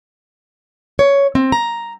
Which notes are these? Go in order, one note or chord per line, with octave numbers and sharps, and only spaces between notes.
C#5
C4
A#5